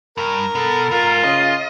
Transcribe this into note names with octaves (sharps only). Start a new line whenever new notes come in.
G2 A#4
B2 A4
G#2 F4
C#3 D#5